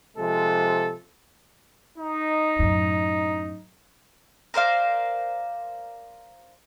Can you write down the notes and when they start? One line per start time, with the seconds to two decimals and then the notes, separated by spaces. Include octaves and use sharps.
0.17 C3 F3 G#3 A4
1.97 D#4
2.59 F#2 A2
4.54 A#4 C5 D5 F5